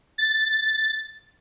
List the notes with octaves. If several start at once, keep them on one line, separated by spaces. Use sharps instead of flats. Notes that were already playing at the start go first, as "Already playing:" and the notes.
A6